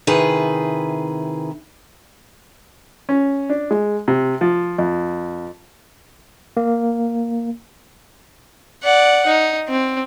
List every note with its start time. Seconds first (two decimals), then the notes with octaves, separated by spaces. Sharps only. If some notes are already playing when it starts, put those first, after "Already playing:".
0.07 C3 D#3 E4 G#4 B4
3.09 C#4
3.50 D4
3.71 G#3
4.08 C3
4.41 F3
4.78 F2
6.57 A#3
8.83 D5 F#5
9.27 D#4
9.68 C4